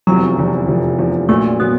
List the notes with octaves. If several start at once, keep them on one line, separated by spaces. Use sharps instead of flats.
F1 E2 C3 F3 F#3
F1 E2 C3 F3
F1 E2 C3 F3
F1 E2 C3 F3
A#1 A#2 F#3 A3
A#2 F#3 B3